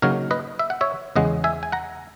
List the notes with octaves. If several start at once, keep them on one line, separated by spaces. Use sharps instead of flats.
C#3 F#3 A#3 D#4 A#4 C#5
B4 D#5
E5
F#5
C#5 E5
E2 C#3 G#3 D#5 F#5
E5 G#5
G#5
F#5 A#5